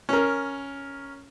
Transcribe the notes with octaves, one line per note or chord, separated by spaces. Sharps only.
C#4 A#4